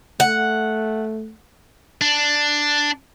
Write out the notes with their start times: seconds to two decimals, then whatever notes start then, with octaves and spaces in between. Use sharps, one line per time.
0.20 A3 F#5
2.01 D4